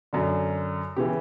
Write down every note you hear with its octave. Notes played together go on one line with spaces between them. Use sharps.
F#2 D3
C#3 E3 G4